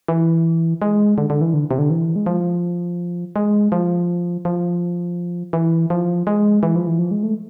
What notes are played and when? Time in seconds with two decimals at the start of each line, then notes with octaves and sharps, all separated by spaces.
0.08 E3
0.82 G#3
1.18 D3
1.30 D3
1.41 E3
1.54 D3
1.71 C3
1.79 D3
1.90 E3
2.16 G#3
2.26 F3
3.36 G#3
3.72 F3
4.45 F3
5.53 E3
5.90 F3
6.27 G#3
6.63 E3
6.76 F3
6.87 E3
6.99 F3
7.11 G#3
7.23 A3